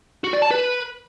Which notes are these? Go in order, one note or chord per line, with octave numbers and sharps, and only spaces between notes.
F#4
D5
A5
B4